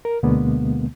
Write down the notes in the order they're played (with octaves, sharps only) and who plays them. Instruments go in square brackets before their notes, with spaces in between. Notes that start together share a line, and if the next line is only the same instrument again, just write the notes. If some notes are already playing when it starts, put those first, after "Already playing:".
[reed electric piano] A#4
D2 B2 D3 G#3 A#3 B3